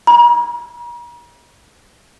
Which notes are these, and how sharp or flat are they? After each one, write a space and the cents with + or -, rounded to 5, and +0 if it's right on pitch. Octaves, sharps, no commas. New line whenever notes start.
A#5 +40